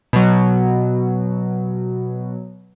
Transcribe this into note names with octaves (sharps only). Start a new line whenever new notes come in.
B2 F#3